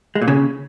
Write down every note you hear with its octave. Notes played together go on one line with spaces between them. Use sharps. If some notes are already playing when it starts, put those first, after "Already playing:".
G#3
A#2
C#3